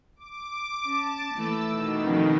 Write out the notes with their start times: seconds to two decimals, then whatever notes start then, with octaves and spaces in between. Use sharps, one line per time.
0.16 D6
0.84 C#4 A5
1.34 E3 A3 E6
1.69 B2 D#3
2.03 F2 C#3